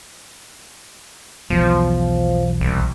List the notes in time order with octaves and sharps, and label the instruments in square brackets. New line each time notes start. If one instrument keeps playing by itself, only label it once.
[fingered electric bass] B1 E2 [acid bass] F3
[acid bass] C2